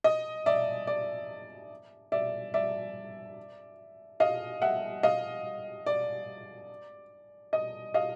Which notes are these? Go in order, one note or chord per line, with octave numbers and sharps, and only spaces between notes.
D#5
D5 E5
D5
D5 E5
D5 E5
D#5 F5
E5 F#5
D#5 F5
D5
D#5
D#5 F5